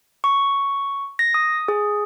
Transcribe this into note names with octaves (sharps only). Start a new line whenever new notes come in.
C#6
A#6
D#6
G#4